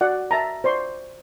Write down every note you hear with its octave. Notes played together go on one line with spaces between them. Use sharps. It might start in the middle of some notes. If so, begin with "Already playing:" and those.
F#4 D5 F#5
E5 A5 A#5
C5 D5 C6 C#6